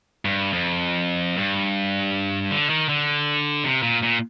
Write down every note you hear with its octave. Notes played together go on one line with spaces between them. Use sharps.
G2
F2
G2
D3
D#3
D3
C3
A#2
A#2